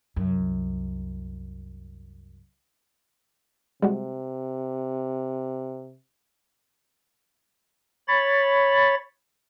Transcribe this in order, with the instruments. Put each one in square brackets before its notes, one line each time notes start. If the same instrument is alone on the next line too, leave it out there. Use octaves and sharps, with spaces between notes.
[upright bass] C2 F#2
[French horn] C3 [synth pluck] G3 G#3 F#4
[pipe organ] C#5 B5 A6